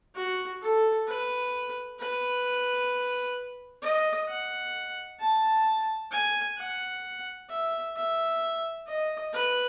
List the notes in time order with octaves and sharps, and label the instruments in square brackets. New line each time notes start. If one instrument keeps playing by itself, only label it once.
[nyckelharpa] F#4
A4
B4
B4
D#5
F#5
A5
G#5
F#5
E5
E5
D#5
B4